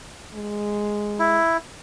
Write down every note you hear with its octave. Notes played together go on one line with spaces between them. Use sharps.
G#3
E4